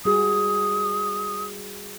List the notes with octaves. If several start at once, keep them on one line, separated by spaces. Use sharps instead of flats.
G3 F#4 G#4 D#6